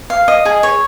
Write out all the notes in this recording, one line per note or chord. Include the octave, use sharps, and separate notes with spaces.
F5
D#5
G#4
C#5